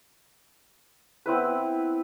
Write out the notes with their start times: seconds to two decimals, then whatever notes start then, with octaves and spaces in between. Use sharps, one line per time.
1.26 B3 C4 E4 B4